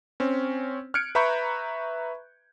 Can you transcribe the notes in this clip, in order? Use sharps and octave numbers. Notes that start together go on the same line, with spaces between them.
C4 C#4
F6 F#6 G#6 C#7 D7
B4 E5 A#5 B5 C#6 G6